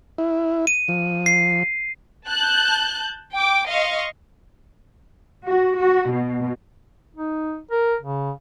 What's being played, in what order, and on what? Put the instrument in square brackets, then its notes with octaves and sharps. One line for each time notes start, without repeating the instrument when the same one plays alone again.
[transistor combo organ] E4
[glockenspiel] D#7
[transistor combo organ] F3
[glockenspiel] C7
[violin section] A5 F#6 G6
G5 D6
D#5 F5 C6 C#6
[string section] F#4
F#4
B2
[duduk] D#4
A#4
C#3